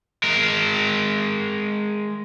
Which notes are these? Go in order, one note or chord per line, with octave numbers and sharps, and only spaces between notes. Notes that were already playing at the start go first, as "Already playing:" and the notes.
G#3 A#4